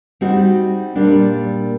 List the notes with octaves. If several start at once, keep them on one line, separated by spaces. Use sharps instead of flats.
G3 C4 D#4 F#4
A#2 G3 A#3 D4